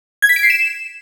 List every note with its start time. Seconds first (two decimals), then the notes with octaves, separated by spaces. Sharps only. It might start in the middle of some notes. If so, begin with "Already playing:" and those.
0.22 G#6
0.29 B6
0.36 D7
0.43 C7
0.50 E7